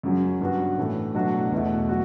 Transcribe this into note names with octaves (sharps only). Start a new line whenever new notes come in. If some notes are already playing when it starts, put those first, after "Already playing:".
F#2 C#3 F#3 C#4
G2 F#3 B3 D4 F#4
A2 E3 A3
B2 F#3 A3 D4 F#4
E2 B2 A3 E4
F#3 F#4